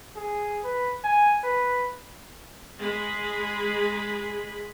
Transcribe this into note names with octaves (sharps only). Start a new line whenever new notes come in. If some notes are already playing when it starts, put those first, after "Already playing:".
G#4
B4
G#5
B4
G#3 G#4 B5